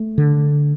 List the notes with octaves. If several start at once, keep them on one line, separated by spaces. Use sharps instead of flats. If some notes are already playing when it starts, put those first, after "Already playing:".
Already playing: A3
D3